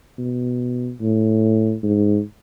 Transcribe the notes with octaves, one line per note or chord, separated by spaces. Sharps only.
B2
A2
G#2